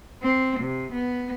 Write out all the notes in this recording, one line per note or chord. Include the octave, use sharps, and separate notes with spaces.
C4
C3
B3